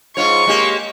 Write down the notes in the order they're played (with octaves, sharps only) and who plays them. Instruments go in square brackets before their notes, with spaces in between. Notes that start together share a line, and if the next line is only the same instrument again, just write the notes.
[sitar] G#2 F4 C#5 [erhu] C#6
[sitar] G#3 A#3 G4